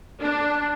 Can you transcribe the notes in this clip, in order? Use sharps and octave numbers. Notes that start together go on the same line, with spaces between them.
D4